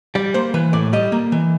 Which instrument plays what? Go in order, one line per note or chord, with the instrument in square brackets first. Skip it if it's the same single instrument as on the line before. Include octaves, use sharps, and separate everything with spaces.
[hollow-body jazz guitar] G3 D5
A#3 C5
E3 B4
A2 D5
G3 D#5
A#3
E3